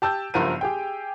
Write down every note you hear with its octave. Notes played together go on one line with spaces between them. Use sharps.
G4 A5 E6 G6
F#1 G2 F3 A#4 F#5 D#7
G4 G#4 G5